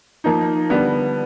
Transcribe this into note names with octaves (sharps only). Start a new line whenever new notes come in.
F3 A#3 D#4
D3 G3 B3